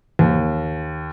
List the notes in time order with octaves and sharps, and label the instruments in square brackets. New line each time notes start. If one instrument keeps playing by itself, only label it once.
[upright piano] D#2